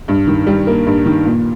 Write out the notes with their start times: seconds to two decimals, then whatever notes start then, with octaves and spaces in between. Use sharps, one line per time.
0.08 G2
0.27 D#3
0.47 G3
0.67 A#3
0.86 G2
1.06 D#3
1.25 A#2